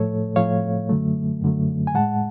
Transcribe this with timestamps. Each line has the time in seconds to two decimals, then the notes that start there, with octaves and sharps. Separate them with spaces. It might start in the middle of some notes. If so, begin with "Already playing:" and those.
Already playing: A2 F3 A3 A4 C#5
0.36 A2 F3 A3 C#5 F5
0.89 F#2 D3 F#3 A3
1.42 F#2 D3 F#3 A3
1.87 G#5
1.95 A2 G#3 F#5 A5